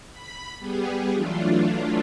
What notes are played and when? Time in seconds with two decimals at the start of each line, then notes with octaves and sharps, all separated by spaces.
0.11 B5
0.59 G3 B3 G4 G#4
1.13 E3 F#3 A3 D4 F4